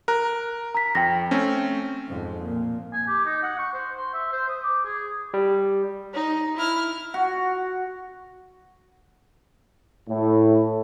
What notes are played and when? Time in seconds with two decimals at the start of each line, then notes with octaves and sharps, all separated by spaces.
0.08 A#4 A#5 F#6
0.75 A#5 B6
0.95 F2 G5 A#6
1.31 A3 C4 C#4
2.09 F2 G#2
2.43 A#2
2.93 G#5
3.07 G4
3.26 D#4
3.43 F#5
3.59 C#6
3.74 C5
3.97 C6
4.14 E5
4.32 C5
4.49 D#6
4.63 D6
4.85 G#4
5.34 G3
6.14 D#4
6.57 E4 F6
7.14 F#4
10.09 A2